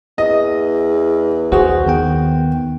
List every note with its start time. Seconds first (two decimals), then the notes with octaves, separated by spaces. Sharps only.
0.18 E2 D#5
1.52 D#2 F#4 G#4 C5
1.87 D#3 B3 G5